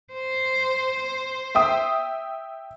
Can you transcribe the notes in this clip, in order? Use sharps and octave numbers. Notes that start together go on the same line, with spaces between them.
C5
E5 G5 D#6